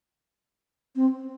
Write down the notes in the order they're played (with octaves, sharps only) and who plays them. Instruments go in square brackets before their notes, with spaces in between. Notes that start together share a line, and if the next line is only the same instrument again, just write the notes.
[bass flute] C4